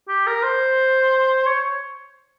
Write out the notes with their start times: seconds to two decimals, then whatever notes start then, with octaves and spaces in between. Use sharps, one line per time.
0.09 G4
0.27 A#4
0.43 C5
1.46 C#5